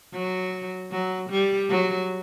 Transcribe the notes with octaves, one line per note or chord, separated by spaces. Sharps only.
F#3
F#3
G3
F#3